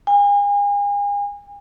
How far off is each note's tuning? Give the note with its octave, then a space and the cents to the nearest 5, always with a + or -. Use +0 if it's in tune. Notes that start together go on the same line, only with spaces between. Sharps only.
G#5 -40